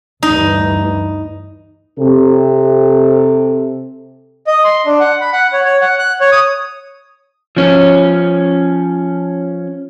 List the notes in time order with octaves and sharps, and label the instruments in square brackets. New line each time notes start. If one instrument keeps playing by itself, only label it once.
[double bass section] D2 G2 E3 [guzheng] D#4
[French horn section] C3 A4
[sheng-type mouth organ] D#5
C6
D4
F#5
B5
F#5
C#5
C#5
F#5
F#6
C#5
D#6
[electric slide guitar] F3 C#4